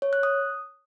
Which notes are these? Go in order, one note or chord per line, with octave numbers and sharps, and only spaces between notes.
C#5
F#6
D#6